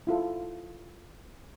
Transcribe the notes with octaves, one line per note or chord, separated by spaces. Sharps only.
E4 F4 A4